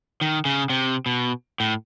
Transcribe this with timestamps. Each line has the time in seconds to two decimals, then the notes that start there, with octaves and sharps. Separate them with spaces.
0.21 D#3
0.45 C#3
0.70 C3
1.06 B2
1.60 A2